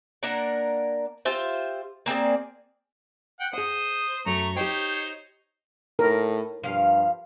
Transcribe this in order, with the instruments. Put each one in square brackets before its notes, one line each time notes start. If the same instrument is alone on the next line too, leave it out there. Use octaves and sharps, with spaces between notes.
[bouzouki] A#3 D4 A#4 F#5
F4 G4 C5 E5
A#3 C4 G#4 D5
[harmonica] F#5 G5
[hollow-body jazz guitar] G#4 F#5 [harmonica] C5 D#6
[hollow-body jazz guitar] F#2 [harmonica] A3 A#5 C#6
[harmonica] D#4 C5 C#5 [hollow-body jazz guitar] G4 G5
[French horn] A2 [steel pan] A#4
[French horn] G2 [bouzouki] F3 F5